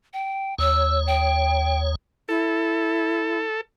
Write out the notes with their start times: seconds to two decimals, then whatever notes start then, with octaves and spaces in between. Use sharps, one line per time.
0.13 G5
0.58 D#2 C#5 E6
1.07 G5
2.29 E4 A4